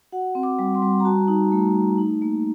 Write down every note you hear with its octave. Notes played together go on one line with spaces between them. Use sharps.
F#4 F#5
C4
D6
G3
C6
G3
A#5
F#4 A5
D#4
A3
A3
D#4
A#3